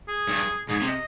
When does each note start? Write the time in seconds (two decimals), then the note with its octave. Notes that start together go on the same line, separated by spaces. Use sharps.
0.08 G#4
0.29 G2
0.68 G#2 G#4
0.81 C3
0.88 D#5